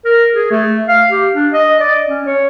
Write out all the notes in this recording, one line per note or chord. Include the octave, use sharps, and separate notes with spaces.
A#4
G#4
A3
F5
G4
D4
D#5
D5
C#4
C#5